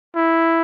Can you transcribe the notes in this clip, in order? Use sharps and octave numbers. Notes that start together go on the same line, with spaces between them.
E4